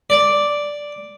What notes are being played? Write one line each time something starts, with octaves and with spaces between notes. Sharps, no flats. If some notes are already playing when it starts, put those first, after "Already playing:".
D5